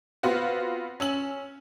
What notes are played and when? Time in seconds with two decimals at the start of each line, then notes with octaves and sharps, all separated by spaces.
0.23 B3 C4 F4 F#4
1.00 C#4 E6 F#7